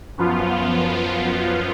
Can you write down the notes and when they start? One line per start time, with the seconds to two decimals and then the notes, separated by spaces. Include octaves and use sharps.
0.18 F#2 F3 B3 F4